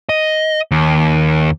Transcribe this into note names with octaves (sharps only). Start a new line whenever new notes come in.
D#5
D#2